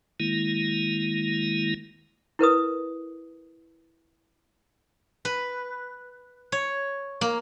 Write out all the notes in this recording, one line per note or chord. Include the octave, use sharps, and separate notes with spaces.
D#3 G#3 A#3 E4
E4 A#4 B4 D#6
B4
C#5
A#3